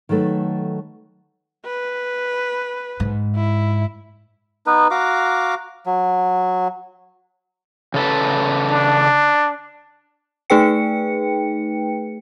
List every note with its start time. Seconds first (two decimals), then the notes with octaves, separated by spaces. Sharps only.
0.09 D#3 F#3 A3 A4 B4
1.66 B4
3.00 G#2
3.37 E4
4.67 B3 D#4 B4
4.91 F#4 F5 A#5 D6
5.86 F#3
7.94 C#3 A4 B4
8.72 D4
10.50 A3 D#4 G#4 B4 G5 C#7